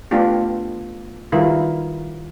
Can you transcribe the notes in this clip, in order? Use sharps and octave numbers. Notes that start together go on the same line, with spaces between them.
A3 B3 D4 F4 G4
D#3 G3 E4 F4 A#4 B4